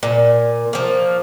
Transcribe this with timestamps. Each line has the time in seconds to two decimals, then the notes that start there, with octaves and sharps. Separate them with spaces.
0.03 A#2
0.73 F3 A#3